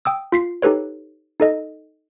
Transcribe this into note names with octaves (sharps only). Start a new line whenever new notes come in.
G5 D#6 E6
F4 B6 C7
D#4 G4 A4 B4 C#5
D#4 A4 D#5